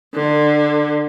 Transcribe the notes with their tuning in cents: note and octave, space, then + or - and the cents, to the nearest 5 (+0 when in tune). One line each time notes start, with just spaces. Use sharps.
D3 +25